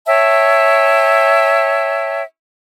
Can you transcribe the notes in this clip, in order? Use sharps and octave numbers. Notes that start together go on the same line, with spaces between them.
C#5 E5 G5 A5